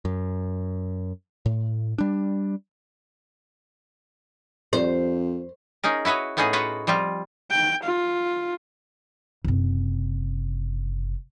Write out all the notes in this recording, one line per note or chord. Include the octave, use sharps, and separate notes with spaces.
F#2
A2
G3 D4
F2 C5
C#4 D#4 G#4 A#4
E4 F#4 B4 C#5 D#5
A2 B3 C#4 D#4 G#4 D#5
F4 F#4 B4 C#5 D#5 F#5
F3 G3 C4 F4
G5
F4
F#1 C3